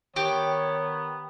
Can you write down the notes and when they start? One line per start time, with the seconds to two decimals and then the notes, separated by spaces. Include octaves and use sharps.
0.16 D#3 B3 G4 C#5